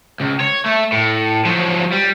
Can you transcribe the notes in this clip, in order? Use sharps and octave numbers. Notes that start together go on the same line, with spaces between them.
C#2
C#5
A3
A2
F3 F#3
G3